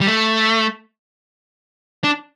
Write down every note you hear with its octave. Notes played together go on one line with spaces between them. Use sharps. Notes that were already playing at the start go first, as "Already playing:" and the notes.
G3
A3
D4